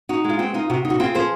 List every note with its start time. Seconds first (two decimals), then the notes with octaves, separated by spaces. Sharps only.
0.09 D#4 F#4
0.24 G#3
0.30 F4
0.39 C4 F#4
0.54 D#4 F4
0.70 C3 F#4
0.85 D#4
0.90 F#4
1.00 C4 F4 G#4
1.15 F3 G#4 C5